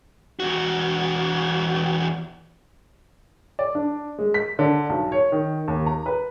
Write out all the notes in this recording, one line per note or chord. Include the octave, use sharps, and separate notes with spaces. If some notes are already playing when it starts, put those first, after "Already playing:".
E2 F#4
D5
D4
G#3
B6
D3
B1
C#5
D#3
D#2
A#5
B4